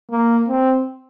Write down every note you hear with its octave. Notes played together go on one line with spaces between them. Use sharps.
A#3
C4